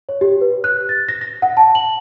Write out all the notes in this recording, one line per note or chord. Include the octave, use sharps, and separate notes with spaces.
C#5
G4
B4
F#6
A6
A#6
A#6
F#5
A5
F#7